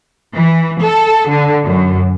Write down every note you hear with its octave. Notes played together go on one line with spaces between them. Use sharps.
E3
A4
D3
F#2